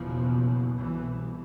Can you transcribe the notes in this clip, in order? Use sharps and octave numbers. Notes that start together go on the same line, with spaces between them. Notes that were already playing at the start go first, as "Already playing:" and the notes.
Already playing: F#1 E2 B2 F3
C2 B2 E3